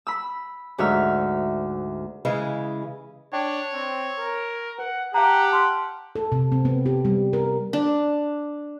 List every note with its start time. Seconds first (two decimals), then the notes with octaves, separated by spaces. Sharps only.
0.07 B5 E6
0.78 D2 G#2 F#4 E5 E6 F6
2.25 C#3 E3 G#3
3.33 D4 C#5 G5
3.73 C4
4.18 A#4
4.79 B4 F#5
5.14 G4 F5 F#5 A5 A#5
5.51 A5 C6 F6
6.15 A4
6.32 C3
6.52 C4
6.65 B3
6.86 G4
7.05 G3
7.33 A#4
7.73 D4